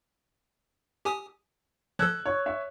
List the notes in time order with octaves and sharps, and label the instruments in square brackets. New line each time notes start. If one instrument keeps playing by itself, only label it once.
[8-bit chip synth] G4 G#5 D#6
[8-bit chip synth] F3 A4 [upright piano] E6 F#6 G#6
[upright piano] C#5
C#5 E5